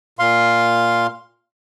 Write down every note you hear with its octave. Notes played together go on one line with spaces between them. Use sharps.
A#2 F5 C6